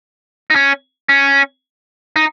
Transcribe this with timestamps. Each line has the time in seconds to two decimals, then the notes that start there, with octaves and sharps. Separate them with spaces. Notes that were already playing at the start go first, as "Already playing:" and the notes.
0.50 D#4
0.55 C#4
1.09 C#4
2.16 D#4